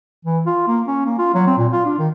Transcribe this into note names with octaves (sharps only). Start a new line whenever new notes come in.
E3
F4
A#3
C#4
A#3
F4
F#3
C4
A#2
F4
D4
D#3